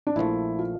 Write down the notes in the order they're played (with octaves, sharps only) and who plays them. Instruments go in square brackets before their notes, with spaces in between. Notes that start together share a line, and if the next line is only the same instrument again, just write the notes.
[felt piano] D4
[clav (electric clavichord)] A#1 A#2 F3 A3 [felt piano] E4
[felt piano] F4